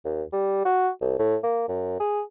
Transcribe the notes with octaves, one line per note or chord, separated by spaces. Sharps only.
D#2
G3
F#4
C2
A2
A#3
F#2
G#4